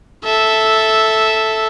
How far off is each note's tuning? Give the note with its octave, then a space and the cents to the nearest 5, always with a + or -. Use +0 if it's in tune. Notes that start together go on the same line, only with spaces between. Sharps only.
A4 +0 E5 -5